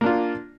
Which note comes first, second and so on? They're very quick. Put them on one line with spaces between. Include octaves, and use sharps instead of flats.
A#3 D4 F4